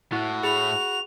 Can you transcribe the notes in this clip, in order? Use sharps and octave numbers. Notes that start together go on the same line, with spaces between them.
A2 E4 F#4
G#4 B5 F7